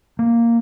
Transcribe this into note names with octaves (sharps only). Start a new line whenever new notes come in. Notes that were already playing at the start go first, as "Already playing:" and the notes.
A#3